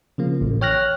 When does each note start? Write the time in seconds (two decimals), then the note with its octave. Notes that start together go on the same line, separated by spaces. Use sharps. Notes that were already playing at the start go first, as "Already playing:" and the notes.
0.18 C#3 F3 A#3
0.41 A1
0.61 C#5 G5 F6 F#6 A#6